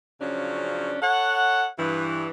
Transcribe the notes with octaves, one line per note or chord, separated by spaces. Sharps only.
C#3 F3 F#3 C#4 D4
A4 C#5 F#5
G2 E3